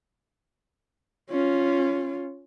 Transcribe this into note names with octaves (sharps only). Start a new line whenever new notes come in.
C#4 F4